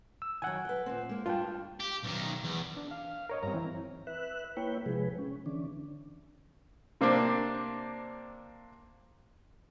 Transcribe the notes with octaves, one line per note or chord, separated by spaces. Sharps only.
E6
D#3 F#3 F#5 G#5
B4 G5
A#2 C4
G#3 A#3
G2 D4 F4 G5 A5
G4
B1 D#3
E2
D4
F5
A#4 C#5 D#5
G2 C4 C#5 A#5
E3 C4 E4
B4 E5 F#6
A#3 E4 B4 C#5 G5
C3 F3 G#3 G#4 B4
C#4
D3 E3 C#4 D4
C3 A#3 C4 D4